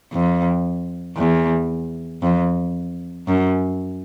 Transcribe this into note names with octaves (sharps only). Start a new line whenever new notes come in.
F2
E2
F2
F#2